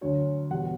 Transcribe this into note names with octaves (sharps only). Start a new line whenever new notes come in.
D2 D3 F#3 C#5
E2 B2 G3 F#5